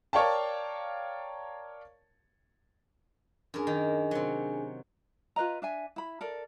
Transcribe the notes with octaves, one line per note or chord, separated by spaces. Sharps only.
A#4 C#5 D5 F5 G5 A5
F#2 D4 G#4 A#4 G#5
D#3
C3 F#3
F4 B4 D#5 A#5
D4 E5 G#5
E4 B5
A4 A#4 D5